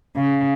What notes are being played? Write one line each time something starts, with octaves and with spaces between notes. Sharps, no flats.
C#3